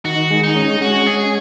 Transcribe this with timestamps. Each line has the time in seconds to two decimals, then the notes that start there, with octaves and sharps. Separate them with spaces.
0.05 D#3 F#4
0.30 G#3
0.43 D#4
0.56 C#4
0.81 G#3 F#4
1.06 C#4 G#4